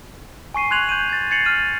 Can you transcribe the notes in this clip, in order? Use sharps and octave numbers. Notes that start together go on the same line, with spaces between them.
G#5 C#6 C7 D#7
C6 F#6 G#6 F7 F#7
G6 D#7
G#6 A6
G#6 A6 C7 C#7 F7 F#7
F6 D#7